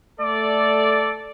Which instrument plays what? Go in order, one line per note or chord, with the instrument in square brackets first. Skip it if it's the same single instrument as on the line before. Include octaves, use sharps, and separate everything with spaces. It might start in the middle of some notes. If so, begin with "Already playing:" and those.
[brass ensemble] A3 A4 D5